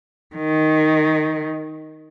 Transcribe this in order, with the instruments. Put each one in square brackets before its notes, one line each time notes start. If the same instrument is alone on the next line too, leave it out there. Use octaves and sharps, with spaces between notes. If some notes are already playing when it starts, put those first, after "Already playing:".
[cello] D#3